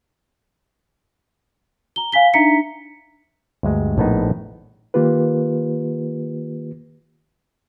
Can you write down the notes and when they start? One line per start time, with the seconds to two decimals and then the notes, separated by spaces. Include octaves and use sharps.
1.96 A#5 G7
2.12 F5 G#5 B6 G7
2.34 D4 D#4 E5 A#5 B6 C#7
3.63 D2 G2 G#3
3.98 A#1 A2 B3 D#4
4.94 D#3 A#3 F4 G4 B4